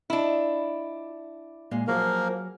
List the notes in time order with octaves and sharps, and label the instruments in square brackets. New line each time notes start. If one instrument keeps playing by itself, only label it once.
[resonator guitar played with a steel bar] D4 E4 [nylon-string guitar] F4 D#5
[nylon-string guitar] A#2 G#3 F5
[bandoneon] F3 A#3 A#4 [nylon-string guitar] F#3 G#4 C#5